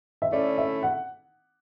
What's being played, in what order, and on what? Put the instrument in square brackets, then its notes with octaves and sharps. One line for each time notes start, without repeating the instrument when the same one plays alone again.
[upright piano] E5
[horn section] D3 A3 C#4 E4 [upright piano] D5
[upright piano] E5
F#5